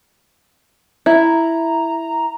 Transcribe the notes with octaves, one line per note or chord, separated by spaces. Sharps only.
E4 A#5